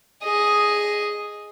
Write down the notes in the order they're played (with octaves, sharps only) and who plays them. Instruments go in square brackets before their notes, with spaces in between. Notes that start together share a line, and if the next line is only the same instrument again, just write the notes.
[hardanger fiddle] G#4 D#5